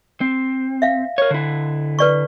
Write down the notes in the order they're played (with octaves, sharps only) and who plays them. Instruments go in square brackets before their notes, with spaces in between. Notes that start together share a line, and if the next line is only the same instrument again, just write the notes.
[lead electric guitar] C4
[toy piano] E5 F5
[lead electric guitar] A#4 C#5
D3 E4
[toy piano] B4 D5 C#6